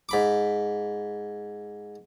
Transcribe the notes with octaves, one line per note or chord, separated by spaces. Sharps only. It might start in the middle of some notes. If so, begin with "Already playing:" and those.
G#2 B5 D6